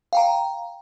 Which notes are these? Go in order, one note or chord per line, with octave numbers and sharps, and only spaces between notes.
F5 G5 A#5